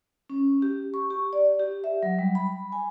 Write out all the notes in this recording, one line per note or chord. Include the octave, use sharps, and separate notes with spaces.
C#4
G4
C#6
G4
D5
G4
E5
F#3
G3
B5
G#5